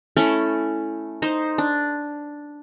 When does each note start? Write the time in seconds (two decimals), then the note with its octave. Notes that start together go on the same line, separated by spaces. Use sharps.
0.17 A3 C#4 E4
1.22 D#4 C5
1.58 D4